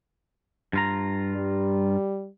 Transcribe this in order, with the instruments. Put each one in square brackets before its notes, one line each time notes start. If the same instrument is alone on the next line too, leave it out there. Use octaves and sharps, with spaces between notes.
[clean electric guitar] G2 F4 A#5
[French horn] G3